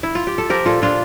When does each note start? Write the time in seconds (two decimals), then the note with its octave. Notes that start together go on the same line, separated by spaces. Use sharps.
0.03 E4
0.15 F4
0.27 G4
0.38 A4
0.50 F3 G4 A#4
0.66 A#2 F4 A4
0.82 A#2 D4 F4